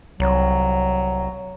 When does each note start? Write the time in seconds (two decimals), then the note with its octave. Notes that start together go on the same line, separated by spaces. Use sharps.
0.20 C2 F#3